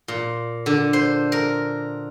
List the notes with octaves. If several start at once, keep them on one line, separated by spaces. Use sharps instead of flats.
A#2
D3
C5
A#4